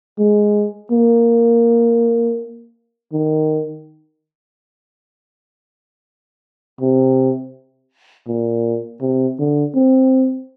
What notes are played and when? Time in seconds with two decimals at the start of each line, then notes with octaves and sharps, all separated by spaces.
0.19 G#3
0.92 A#3
3.13 D#3
6.81 C3
8.27 A#2
9.01 C3
9.39 D3
9.75 C4